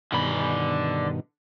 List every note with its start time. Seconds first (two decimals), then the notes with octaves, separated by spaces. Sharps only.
0.12 G2 B2 D3 D#3 B5